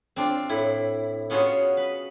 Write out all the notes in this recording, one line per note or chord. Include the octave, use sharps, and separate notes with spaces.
C4 D4 F4
A2 E4
B3 C#4 F4 F#4 G#4 C#5
B4